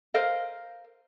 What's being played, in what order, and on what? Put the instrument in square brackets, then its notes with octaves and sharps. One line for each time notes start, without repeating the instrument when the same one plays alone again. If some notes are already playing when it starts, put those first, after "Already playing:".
[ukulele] A#4 C5 D#5 F5